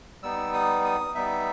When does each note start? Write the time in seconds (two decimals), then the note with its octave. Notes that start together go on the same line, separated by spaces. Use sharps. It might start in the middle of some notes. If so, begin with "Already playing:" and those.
0.23 G3 B3 D#4 E6
0.53 D#6
0.84 D#6
1.15 G3 B3 D#4 E5